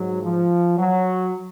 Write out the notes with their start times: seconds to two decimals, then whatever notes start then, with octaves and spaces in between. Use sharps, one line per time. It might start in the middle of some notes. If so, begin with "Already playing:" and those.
Already playing: G#2 F#3
0.22 F3
0.78 F#3